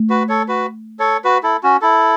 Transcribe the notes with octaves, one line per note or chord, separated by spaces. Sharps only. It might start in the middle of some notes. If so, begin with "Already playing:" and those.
Already playing: A3
F#4 B4
A4 C#5
F#4 B4
A4 C#5
F#4 B4
E4 A4
C#4 F#4
E4 A4